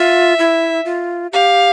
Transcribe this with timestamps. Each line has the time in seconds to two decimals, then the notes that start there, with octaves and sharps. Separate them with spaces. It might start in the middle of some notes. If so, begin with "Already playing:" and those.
Already playing: F4 E5
0.39 E4
0.85 F4
1.32 G4 F5